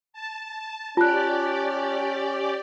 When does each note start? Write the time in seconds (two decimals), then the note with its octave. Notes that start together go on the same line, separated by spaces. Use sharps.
0.13 A5
0.97 C#4 F4 G4 D5 A5 F#6